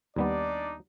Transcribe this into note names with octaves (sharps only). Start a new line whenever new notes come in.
D#2 G3 B3 D4 D#4 D5